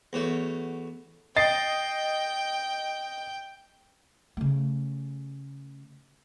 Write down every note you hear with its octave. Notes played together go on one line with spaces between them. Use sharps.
E2 F#3 A3
D#5 G5 A6 C7
C#3 A3